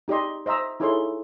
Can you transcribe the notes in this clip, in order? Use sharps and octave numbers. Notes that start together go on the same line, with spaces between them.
D#4 G4 D5 D#5 C6
C5 D#5 E5 A#5 E6
D#4 E4 G#4 A4 C#5 C6